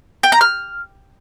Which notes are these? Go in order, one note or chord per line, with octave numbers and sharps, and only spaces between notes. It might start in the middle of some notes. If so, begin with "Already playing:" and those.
G5
A#5
F6